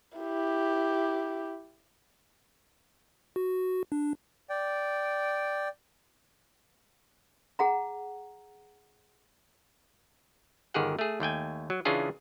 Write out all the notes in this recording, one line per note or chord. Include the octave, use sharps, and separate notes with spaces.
E4 G4
F#4
D4
D5 G5
G#4 F#5 A#5
G1 D#3 G4 G#4 F#5
A3 G#4
D#2 A3 G5 G#5
F#3
C#3 E3 C#4 D4 F4 G#4